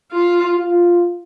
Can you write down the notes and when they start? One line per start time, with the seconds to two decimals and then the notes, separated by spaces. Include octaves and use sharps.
0.12 F4
0.56 F4